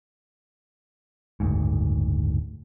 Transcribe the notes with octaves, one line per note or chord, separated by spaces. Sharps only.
F#1 D2 G#2